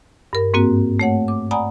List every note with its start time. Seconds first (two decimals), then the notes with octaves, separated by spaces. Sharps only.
0.33 G2 A#4
0.54 G#2 A#3 C4 F#4
0.99 A3 C#5 F#5
1.28 D6
1.51 D5 F#5 G#5 A#5 B5 D#6